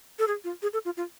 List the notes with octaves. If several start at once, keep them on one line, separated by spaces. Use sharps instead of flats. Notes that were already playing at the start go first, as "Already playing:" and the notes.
A4
G#4
F4
G#4
A4
F4
F4